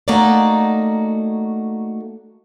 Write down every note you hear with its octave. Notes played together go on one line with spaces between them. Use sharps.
A3 A#3 D#4 F#4 D5